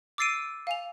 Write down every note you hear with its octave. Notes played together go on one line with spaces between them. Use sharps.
D6 E6 A6 C7 D7 D#7
F5 G#5 F7